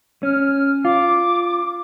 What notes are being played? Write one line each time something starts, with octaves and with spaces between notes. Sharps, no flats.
C#4 F6
F4 D6